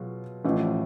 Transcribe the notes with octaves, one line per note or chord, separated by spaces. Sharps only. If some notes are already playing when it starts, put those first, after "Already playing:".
Already playing: B2 F#3 F4 G#4
A1 A2 F3